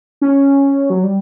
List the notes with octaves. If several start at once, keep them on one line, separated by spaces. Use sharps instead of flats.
C#4
F#3
G3